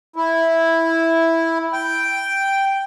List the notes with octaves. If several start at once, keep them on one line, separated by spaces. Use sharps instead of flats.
E4
G5